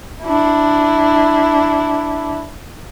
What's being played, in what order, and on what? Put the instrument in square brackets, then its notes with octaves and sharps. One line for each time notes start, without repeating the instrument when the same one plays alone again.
[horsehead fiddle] D4 E4